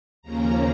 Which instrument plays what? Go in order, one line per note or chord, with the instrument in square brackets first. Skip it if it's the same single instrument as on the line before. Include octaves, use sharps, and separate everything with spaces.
[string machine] D#2 C#3 F3 A#3 C#4 A#5